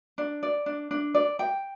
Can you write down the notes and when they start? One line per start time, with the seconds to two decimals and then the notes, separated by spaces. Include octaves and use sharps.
0.18 D4
0.43 D5
0.66 D4
0.91 D4
1.15 D5
1.39 G5